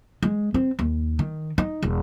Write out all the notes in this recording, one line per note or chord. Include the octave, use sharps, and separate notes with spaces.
G#3
C4
D#2
D#3
D#4
E1